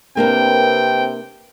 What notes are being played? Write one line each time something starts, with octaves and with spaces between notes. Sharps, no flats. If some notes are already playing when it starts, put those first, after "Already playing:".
C3 A#3 C4 D4 A#4 B4 G5